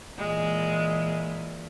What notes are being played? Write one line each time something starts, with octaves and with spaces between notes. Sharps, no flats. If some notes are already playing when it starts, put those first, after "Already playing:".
A#2 E3 G#3